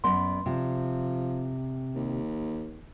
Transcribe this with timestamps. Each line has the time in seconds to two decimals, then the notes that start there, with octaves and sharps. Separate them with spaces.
0.04 F#2 B3 D5 C6
0.46 C3 F3
1.95 D#2